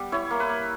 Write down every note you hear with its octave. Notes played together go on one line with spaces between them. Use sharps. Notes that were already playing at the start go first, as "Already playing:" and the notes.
Already playing: G3 B3
E4 C#5
A#3
B4
A#3